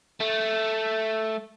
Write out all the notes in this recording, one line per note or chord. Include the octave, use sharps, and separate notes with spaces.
A3